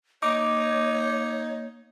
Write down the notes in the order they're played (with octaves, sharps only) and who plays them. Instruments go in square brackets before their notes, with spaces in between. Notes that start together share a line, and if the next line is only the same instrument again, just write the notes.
[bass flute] A#3 [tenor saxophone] D#4 [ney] C#5 [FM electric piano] D6